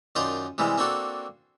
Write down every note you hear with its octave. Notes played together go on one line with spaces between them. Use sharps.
F#2 D#3 F4 C5 D5 D#5
C3 E3 G3 G#3
A#3 C4 D4 F#4 A4